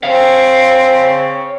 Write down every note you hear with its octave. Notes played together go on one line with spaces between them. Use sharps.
C4 C#5 F5